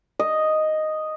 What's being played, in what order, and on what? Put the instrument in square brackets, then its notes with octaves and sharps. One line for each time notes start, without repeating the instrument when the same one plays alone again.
[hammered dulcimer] D#5